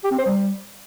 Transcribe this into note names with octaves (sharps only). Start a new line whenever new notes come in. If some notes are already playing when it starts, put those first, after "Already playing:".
G4
C4
C5
G3